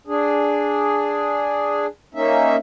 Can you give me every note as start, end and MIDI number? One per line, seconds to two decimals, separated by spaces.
0.07 1.87 62
0.07 1.87 68
2.15 2.56 58
2.15 2.56 61
2.15 2.56 63
2.15 2.56 76